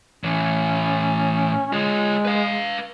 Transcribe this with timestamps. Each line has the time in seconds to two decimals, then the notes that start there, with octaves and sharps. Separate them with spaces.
0.24 A2 E3 C#4
1.73 G#3 F4 C#5
2.25 B4 F5